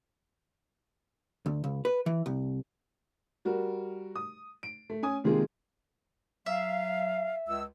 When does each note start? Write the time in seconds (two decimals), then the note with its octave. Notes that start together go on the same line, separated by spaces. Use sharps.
1.46 D2
1.64 C#2
1.85 B4
2.06 E3
2.26 C2
3.45 G3 F#4 A#4
4.15 D#6
4.63 D7
4.90 A3
5.03 C#4 G#5 D#6
5.24 C3 D#3 G#3 A#3 F4 G#4
6.46 F#3 E5 F5
7.47 C#2 E6